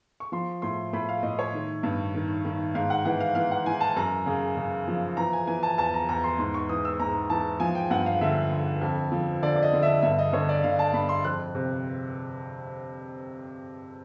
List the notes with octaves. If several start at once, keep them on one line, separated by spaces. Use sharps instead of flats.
C#6
F3 C6
A2 C6
A2 B5
F5
A2 D#5
C#5
D#3
G2
D#3
D#3
G#2 F5
F#5
E3 F#5
F5
E3 F5
F#5
E3 G#5
A5
F#2 A#5
C#3
C#3
F3
E3 A#5
G#5
E3 G#5
A5
E2 A5
A#5
E2 A#5
C6
G#2 C6
C#6
E3 D#6
E6
G#2 A#5
E3 A5
F3 G#5
G5
G2 F#5
F5
D3 E5
D3
F2
F3
D3 D5
D5
D#5
D3
E5
G2 E5
D#5
D3 C#5
D5
D3 F5
A5
G2 B5
C6
F2 F#6
C3